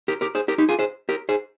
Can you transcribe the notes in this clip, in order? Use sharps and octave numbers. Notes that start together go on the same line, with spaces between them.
G4 A#4
G4 A#4
G#4 C5
G4 A#4
D#4 G4
F4 G#4
G#4 C5
G4 A#4
G#4 C5